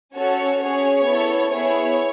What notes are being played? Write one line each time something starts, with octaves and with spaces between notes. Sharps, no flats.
C#4 F#4 A4 C#5
C#4 G#4 C#5
B3 E4 A4
B3 E4 G#4 C#5